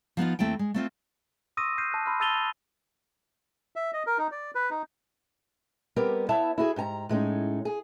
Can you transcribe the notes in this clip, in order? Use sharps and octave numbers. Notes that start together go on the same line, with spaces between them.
F3 B3 D#4 F4
D#2 A3 C4 E4 G5
G#3
A3 C4 F4
C6 C#6 D#6 E6 A#6 D#7
E6 F6 G6 C7 D#7
A5 F#6 G6
B5 C6 E6 F6
A5 E6 A6 D#7 F7 G7
F7
E5
D#5
A#4
D#4
D5
B4
D#4
G3 B3 C4 G4 A#4
B3 E4 C#5 E5 A5
E4 F#4 G#4
G#2 G4 G#5 A#5
A2 G#3 C#4 D#4
G#4